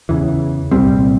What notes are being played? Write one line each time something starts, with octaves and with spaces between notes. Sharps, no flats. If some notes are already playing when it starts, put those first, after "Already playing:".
E2 C#3 E3
C2 A#2 G3 C4